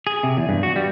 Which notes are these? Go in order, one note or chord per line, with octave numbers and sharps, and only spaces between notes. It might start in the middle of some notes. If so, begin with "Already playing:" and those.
G#4
C3
E2
G2
F#4
G3